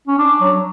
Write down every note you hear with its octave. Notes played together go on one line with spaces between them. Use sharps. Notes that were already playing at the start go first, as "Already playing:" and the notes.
C#4
D4
F#3